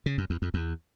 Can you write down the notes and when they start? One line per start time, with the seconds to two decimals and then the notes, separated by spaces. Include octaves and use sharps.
0.06 C#3
0.18 F#2
0.30 E2
0.42 F2
0.54 E2